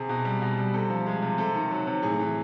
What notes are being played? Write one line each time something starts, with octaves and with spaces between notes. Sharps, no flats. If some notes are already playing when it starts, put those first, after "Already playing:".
Already playing: C3 G#4
B2
G3
B2
G3
C3 A4
F3
G#3
C3
C3 A4
D#3
F#3
C3
A2 G#4
E3